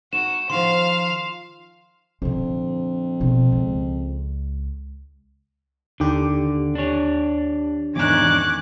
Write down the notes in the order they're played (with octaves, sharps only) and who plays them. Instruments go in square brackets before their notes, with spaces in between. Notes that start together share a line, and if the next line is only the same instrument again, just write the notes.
[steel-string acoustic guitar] D#4 [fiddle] F#4 [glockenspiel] E7
[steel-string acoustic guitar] D#3 F3 [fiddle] F5 [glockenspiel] C6
[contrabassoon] F2 [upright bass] A#2 D3
[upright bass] B2 A#3
C#2
[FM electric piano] D#2 G4 [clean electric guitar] D3
[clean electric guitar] D4 C#5
[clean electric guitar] E2 G#2 D4 [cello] D#3 C#4 [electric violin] D6 F#6